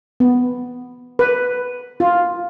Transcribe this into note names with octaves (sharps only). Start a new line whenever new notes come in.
B3
B4
F4